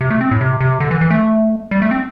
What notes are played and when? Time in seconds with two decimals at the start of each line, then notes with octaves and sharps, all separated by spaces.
0.01 C3
0.10 A3
0.21 C4
0.31 A2
0.41 C3
0.61 C3
0.80 D3
0.91 E3
1.01 E3
1.10 A3
1.71 G3
1.82 A3
1.91 C4